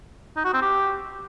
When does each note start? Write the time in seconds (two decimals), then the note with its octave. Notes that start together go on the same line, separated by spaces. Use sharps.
0.36 D#4
0.45 F#4
0.54 C4
0.62 G4